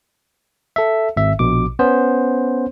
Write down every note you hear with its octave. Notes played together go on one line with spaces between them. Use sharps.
A4 E5
G#1 E5
A#1 B2 D6
B3 C#4 C5